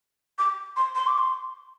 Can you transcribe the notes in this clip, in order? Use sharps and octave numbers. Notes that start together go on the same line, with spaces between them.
D6
C6
C6
D6
C6